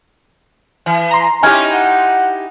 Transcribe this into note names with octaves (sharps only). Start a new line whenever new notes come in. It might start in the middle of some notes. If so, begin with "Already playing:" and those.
E3
A#5 C6
C#4 D#4 E4 G4 G#5 F6 G#6
F#5